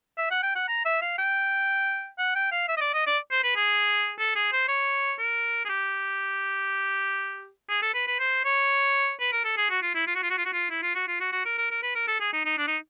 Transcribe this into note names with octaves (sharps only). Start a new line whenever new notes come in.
E5
F#5
G5
F#5
A#5
E5
F5
G5
F#5
G5
F5
E5
D#5
D5
D#5
D5
C5
B4
G#4
A4
G#4
C5
C#5
A#4
G#4
G4
G#4
A4
B4
B4
C5
C#5
B4
A#4
A4
G#4
F#4
F4
E4
F4
F#4
F4
F#4
F4
F#4
F4
E4
F4
F#4
F4
F#4
F#4
A#4
A#4
A#4
B4
A#4
A4
G#4
D#4
D#4
D4
D#4